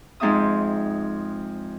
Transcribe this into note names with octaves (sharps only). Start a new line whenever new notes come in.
F2 G#2 C4 D#4 E5 D#6